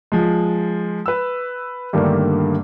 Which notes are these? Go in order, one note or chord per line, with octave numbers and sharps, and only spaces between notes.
F3 G#3
B4 E6
G2 D3 D#3 G3 A3 A#3